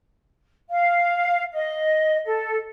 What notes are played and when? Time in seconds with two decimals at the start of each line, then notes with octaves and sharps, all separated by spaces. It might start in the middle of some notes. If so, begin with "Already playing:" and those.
0.70 F5
1.53 D#5
2.25 A4